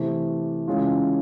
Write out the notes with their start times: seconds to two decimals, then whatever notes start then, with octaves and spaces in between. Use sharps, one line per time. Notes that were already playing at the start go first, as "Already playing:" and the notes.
Already playing: C3 E3 A3
0.68 C#3 E3 G#3 C#4 F4